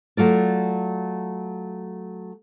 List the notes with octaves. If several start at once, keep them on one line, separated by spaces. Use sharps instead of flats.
F#3 A3 F4 D5